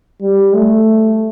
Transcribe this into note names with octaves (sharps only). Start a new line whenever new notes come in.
G3
A3